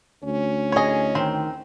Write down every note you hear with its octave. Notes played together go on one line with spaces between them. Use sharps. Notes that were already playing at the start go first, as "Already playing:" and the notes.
D2 C#4
E4 G#4 C#5 D#5
D#3 C4